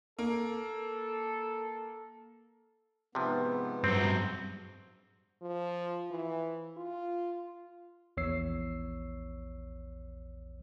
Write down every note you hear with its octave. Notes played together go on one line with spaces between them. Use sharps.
A#3 A4
G#2 C3 F3 B3
G2 F#3 C4
F3
E3
F4
A#1 E2 C#5 E6 C7